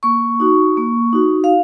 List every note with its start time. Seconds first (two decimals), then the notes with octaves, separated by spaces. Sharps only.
0.03 A#3 C#6
0.40 D#4 F#4
0.77 A#3
1.13 D#4 F#4
1.44 F5